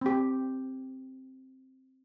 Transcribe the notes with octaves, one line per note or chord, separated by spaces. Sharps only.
C4 G4